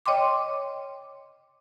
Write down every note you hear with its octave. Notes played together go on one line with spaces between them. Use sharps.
C#5 D#5 G5 C6 D6